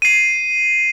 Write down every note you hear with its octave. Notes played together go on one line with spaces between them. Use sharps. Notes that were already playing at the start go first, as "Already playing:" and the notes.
C7 D#7